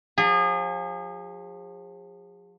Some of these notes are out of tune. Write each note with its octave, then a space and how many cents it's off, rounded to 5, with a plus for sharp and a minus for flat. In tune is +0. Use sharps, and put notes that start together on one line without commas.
F3 +40 G#4 -35